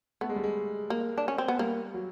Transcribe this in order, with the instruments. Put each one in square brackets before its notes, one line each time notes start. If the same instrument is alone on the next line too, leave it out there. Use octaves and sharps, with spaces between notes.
[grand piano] A3 [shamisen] B3
[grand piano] G#3
G3
G#3
[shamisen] A#3
D4
C#4
C4
B3
[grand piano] G3 [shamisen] A#3
[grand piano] F#3